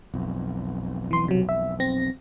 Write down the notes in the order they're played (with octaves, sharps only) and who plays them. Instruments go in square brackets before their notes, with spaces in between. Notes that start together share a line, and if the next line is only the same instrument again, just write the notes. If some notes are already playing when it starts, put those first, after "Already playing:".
[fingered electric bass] B1 F2
[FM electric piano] E3 C6
C3 F#3
E5
C4 A#6